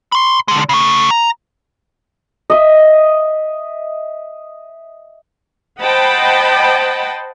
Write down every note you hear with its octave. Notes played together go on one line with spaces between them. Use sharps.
B5 C6
D3 G#3
C#3 A3
A#5
D#5 E5
C5 D#5 F#5 G5 A5 B5